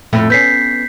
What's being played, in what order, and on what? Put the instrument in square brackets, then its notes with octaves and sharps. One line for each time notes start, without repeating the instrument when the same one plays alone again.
[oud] F2 A2 A3
[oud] B3 C#4 [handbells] G6 B6 C7